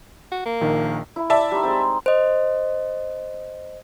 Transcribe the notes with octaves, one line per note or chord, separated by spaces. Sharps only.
F#4
A#3
A#1 D#3
E4
D5 E5 A5
G3 D#4 C6
G#3 C4
C5 D#5